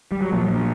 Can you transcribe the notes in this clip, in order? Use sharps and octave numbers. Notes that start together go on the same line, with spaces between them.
G3
F#3
A#2 F3
A#2